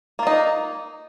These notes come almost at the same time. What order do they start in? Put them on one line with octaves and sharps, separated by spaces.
A#3 F4 D#4